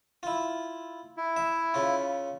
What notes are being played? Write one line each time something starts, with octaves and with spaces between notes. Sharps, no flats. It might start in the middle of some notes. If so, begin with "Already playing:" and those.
E4 F4
E4
E5
C#3 F4